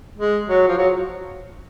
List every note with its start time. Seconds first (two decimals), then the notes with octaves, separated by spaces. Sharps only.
0.18 G#3
0.48 F#3
0.68 F3
0.78 F#3